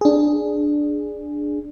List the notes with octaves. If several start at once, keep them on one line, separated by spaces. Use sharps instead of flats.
D4 G#4